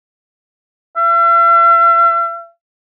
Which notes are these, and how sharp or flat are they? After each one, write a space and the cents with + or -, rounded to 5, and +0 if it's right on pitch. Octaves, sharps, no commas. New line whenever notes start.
E5 +45